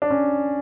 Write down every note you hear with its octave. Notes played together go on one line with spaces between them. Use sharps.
D4
C#4